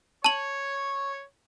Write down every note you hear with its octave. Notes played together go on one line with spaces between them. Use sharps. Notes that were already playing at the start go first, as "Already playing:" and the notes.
C#5 A5 C#6 F#7